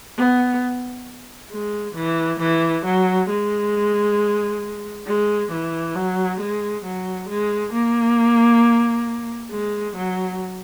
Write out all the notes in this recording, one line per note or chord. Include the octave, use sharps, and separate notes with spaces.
B3
G#3
E3
E3
F#3
G#3
G#3
E3
F#3
G#3
F#3
G#3
A#3
G#3
F#3